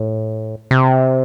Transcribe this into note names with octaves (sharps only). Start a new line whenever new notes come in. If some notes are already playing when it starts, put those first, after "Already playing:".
Already playing: A2
C3